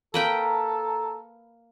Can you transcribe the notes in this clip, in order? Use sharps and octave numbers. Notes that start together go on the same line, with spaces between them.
A#3 A4 B4 G5 A#5